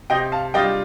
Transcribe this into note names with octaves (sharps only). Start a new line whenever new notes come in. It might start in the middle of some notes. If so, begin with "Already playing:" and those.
C3 D#5 G5
F5 A5
G3 D4 F4 D#5 G5